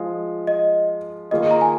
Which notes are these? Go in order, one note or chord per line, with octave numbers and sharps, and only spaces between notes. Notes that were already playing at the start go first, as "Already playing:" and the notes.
Already playing: F3 G#3 F4
D#5
D#3 A#3 F4 G#4 D#5
A#5
G#5